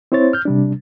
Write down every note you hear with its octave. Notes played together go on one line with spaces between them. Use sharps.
C4 E4 C5 C#5 A6
F6 G6
C3 G3 D4